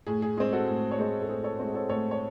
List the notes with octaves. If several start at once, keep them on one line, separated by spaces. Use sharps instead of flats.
A2 G#4
G#4
G#3 C4 G#4
F#4 A4
A2
C#5
G#3 C4 G#4 C5
A4
A2 G#4 C5
A4 C#5
G#3 C4
A4 C#5
A2 A4 C#5
C#5